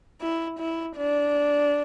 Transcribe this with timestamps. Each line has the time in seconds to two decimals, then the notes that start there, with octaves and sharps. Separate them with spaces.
0.22 E4
0.59 E4
0.97 D4